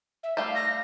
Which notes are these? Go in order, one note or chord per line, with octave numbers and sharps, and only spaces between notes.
E5
G3 A3 F5
A#6